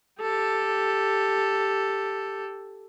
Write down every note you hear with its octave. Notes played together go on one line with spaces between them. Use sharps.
G4 A4